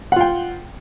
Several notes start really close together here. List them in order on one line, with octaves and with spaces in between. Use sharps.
F#5 F4 G5